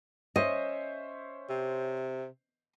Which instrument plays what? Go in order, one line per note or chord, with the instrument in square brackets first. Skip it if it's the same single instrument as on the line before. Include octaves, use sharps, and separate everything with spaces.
[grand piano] C#4 C5 E5 [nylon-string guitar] D#5
[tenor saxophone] C3